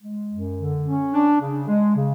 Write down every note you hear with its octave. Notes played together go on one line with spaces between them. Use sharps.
G#3
F#2
D3
C#4
D4
C#3
G#3
C#3